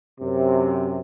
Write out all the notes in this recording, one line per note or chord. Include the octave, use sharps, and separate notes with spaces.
F#2 C3